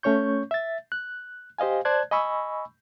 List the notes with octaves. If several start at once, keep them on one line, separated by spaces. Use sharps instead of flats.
A3 C#4 C#5 C#6 G6
E5 A6
F#6
G4 C5 D#5 F5 G#5
C5 D5 A5 F#6 G#6
D#5 G#5 B5 C#6 E6